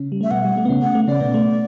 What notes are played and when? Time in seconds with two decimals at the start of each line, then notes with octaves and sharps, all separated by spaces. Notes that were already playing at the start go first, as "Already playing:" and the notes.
Already playing: C#3 C#4
0.12 G3
0.21 A3 E5
0.31 B2 B3 F#5
0.45 G3
0.57 A3
0.65 B3
0.69 C#3 C#4
0.82 A3 F#5
0.95 A3
1.07 C#3 C#4 D5
1.20 B2 B3
1.34 A3